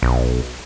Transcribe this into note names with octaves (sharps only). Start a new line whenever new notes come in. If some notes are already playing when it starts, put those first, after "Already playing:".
B1